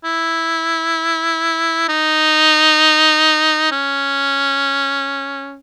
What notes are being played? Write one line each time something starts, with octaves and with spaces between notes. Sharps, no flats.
E4
D#4
C#4